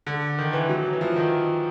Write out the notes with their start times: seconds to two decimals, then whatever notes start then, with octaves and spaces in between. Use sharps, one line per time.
0.07 D3
0.39 D#3
0.53 E3
0.69 F#3
0.93 E3
1.01 F3
1.16 D#3